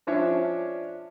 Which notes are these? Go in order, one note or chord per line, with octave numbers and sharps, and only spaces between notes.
F3 C#4 D4 C#5 E5